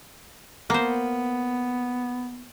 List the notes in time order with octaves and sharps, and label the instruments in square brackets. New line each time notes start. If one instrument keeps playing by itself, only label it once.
[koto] A#3 C5 [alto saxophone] B3